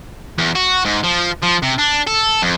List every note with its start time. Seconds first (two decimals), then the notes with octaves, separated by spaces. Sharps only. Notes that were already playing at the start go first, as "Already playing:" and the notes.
0.38 E2
0.55 F#4
0.85 G#2
1.04 F3
1.42 F3
1.62 C3
1.78 D4
2.07 A4
2.42 F2